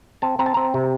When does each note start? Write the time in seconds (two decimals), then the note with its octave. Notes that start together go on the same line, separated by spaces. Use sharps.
0.22 C4 A5
0.39 C4 A#5
0.46 A5
0.54 C4 A#5
0.74 C3